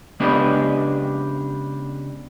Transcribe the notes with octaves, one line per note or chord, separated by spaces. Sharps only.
C#3 G#3 B3 D4 G4 B4